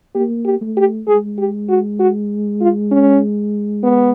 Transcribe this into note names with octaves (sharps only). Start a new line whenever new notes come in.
A#3 G4
G4
A3
G4
G#3 G#4
G4
F#4
F#4
F4
C#4
B3